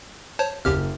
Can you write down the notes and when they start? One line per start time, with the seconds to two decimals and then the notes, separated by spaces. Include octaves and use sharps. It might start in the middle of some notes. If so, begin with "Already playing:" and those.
0.39 C5 C#5 A5
0.65 F#1 D#2 G4 F6